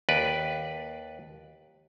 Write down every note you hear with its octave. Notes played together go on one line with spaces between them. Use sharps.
D#2 B4 D5